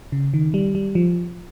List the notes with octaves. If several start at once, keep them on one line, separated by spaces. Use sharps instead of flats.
C#3
D#3
G3
G3
F3